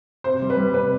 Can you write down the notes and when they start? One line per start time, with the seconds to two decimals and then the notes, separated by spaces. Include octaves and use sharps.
0.24 C3 C5
0.42 G3
0.50 B4
0.57 G3
0.74 C3 B4